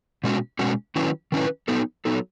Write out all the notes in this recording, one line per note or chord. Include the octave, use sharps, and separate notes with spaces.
B2 G#3 C#4 F#4
B2 G#3 C#4 F#4
D#3 F#3 C#4 E4 B4
D#3 F#3 C#4 E4 B4
F#3 B3 D#4 A4
F#3 B3 D#4 A4